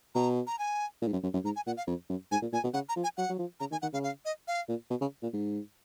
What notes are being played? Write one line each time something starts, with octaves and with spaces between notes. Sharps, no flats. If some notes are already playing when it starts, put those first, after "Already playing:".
B2 A#5
A#5
G#5
A#2
G#2
F#2
F#2
F#2
G#2 A#5
G#5
A#2 F#5
F5
F2
F#2
G#2 G#5
A#2
A#2 G#5
B2
C#3 F#5
A#5
F3
G#5
F#3 F#5
F#3
F3
C#3 A#5
D#3 G#5
D#3 F#5
C#3 F5
F5
D#5
F5
A#2
B2
C#3
A#2
G#2